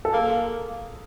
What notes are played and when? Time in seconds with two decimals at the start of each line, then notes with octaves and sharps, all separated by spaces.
0.05 A4
0.13 A#3 G#4